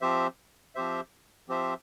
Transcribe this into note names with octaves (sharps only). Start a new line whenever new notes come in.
F3 C4 G4 C5 E5
F3 C4 G4 C5 E5
F3 C4 G4 C5 E5